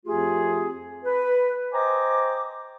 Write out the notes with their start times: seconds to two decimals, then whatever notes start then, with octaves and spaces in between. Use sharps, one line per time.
0.06 F2 F3 A3 F4 G4 G#4
1.04 B4
1.73 C5 D#5 G5 G#5 A#5 D6